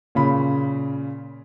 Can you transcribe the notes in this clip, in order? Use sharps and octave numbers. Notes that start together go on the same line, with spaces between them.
A#2 C#3 B5